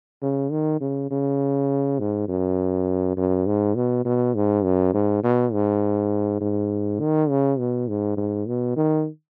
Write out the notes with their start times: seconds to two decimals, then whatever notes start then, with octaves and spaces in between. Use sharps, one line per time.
0.22 C#3
0.51 D#3
0.81 C#3
1.11 C#3
1.99 G#2
2.28 F#2
3.17 F#2
3.46 G#2
3.75 B2
4.05 B2
4.35 G#2
4.64 F#2
4.94 G#2
5.23 B2
5.53 G#2
6.41 G#2
7.00 D#3
7.29 C#3
7.58 B2
7.88 G#2
8.17 G#2
8.46 B2
8.76 D#3